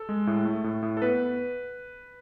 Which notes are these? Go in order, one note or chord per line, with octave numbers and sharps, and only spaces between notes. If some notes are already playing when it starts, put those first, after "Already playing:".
Already playing: A4
G#3
A2
A3
A2
A2
A4
B3 B4